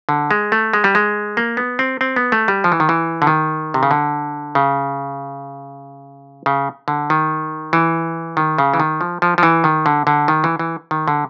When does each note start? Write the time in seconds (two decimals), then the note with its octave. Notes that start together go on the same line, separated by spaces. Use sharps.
0.09 D3
0.31 G#3
0.52 A3
0.73 G#3
0.84 G3
0.95 G#3
1.37 A#3
1.57 B3
1.79 C4
2.01 C4
2.16 B3
2.32 A3
2.48 G3
2.64 F3
2.72 E3
2.80 D#3
2.89 E3
3.22 D3
3.27 D#3
3.74 C3
3.83 C#3
3.91 D3
4.55 C#3
6.46 C#3
6.88 D3
7.10 D#3
7.73 E3
8.37 D#3
8.58 C#3
8.74 E3
8.80 D#3
9.01 F3
9.22 F3
9.38 F3
9.43 E3
9.64 D#3
9.86 D3
10.07 D3
10.28 D#3
10.44 E3
10.59 E3
10.91 D#3
11.08 D3